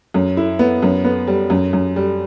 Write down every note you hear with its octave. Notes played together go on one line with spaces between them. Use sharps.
F#2
E4
B3
F#2
B3
G3
F#2
F#2
G3